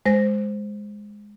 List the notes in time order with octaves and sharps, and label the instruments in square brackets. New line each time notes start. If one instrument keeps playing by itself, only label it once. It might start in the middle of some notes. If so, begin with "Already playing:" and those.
[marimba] G#3 C5 A#6